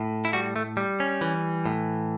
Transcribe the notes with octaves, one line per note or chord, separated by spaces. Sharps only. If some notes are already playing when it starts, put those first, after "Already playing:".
Already playing: A2
E4
G3 F#4
A3
G3
C#4
E3
A2